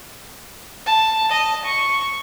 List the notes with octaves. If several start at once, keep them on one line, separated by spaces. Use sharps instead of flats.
A5
D#5
C#6